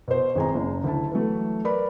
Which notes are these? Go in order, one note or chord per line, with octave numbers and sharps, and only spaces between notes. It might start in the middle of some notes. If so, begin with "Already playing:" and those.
B2 C5
G#1 G#4 A#5
F#1
D2 E4 A5
E3 F#3 A3
A#4 B4 D5 B5